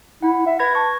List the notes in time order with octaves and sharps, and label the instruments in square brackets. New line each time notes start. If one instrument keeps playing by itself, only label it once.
[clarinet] E4 [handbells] F#5
[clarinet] E5
[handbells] B4 G#6 A#6 [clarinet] B5
[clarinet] A5 [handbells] C#6